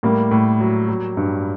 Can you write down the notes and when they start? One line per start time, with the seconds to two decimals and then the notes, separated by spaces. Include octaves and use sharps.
0.03 A2 G3 A#3
0.31 A2
0.60 F#3
0.88 F#3
1.17 G2